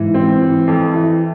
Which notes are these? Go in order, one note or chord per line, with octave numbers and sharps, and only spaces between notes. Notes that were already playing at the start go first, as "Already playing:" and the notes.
Already playing: G#2 E3
C4
E3
F2
E3